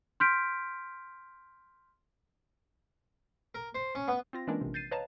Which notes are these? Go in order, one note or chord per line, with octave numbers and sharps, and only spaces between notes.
C6 F6 G6 B6 D7
A#4
C5
C#4
B3
C4 F4 A#6
E3 G#3 A#3 C#4 D4 A#4
A#1 C3
G6 A6 C7 D#7
B4 C#5 D#5 F5 A5 A#5